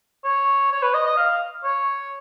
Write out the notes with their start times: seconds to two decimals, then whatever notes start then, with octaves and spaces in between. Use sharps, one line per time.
0.25 C#5
0.71 C#5
0.83 B4
0.94 D#5
1.06 D#5
1.17 F5
1.64 C#5